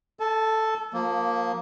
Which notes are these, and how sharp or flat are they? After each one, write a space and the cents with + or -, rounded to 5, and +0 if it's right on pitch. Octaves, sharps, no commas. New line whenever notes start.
A4 +0 A5 -35
F3 +25 A#3 +0